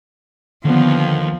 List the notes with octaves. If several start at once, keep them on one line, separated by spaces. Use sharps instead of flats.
D#2 D3 F3 B3